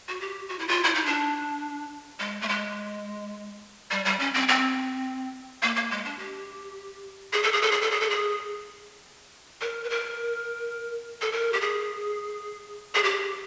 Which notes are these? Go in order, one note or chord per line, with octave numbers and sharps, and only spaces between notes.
F#4
G4
F#4
E4
F4
E4
D#4
D4
G#3
A3
G#3
G3
G3
C#4
C4
C4
A#3
A#3
G#3
D4
G4
G#4
A4
G#4
A4
G#4
A4
G#4
A4
G#4
A#4
B4
A#4
A4
A#4
G4
G#4
G#4
G4